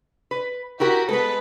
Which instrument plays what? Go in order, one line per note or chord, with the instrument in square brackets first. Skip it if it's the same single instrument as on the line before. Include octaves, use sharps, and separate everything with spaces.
[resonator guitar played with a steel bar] B4
[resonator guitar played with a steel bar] E4 G4 A#4 [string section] F#4
[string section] G#3 B4 [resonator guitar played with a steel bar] B3 A4